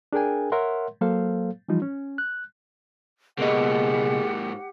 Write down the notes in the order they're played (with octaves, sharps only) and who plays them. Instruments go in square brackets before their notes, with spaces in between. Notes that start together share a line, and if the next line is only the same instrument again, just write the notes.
[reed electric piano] D4 G#4 A#4 G5 G#5
A#4 C#5 E5 F#5 C6
F#3 A#3 A4 C5 F5
E3 F3 G3 D#4 F4
C#4
F#6
[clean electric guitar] C#2 B2 D#5 [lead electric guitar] G#2 A#3 [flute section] G4 F#5 [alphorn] G#4